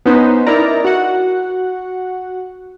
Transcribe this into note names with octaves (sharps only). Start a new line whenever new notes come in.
B3 C#4 D#4 B4 C5
D#4 E4 A#4 D5 A#5
F#4 F#5